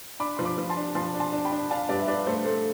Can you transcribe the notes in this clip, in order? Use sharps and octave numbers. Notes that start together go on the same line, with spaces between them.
D4 B5 D6
F3 C6
B5 D6
F3
A5 C6
D4
F3 A5 C6
D4
A5 C6
D4
G5 B5
D4
D4 F5 A5
G2 B4 D5
E5
D4 B4 D5
A3 A4 C5
A3 A4 C5